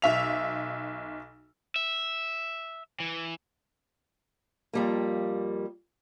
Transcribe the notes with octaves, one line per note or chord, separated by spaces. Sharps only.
B1 E5 F7
E5
E3
F2 G3 A#3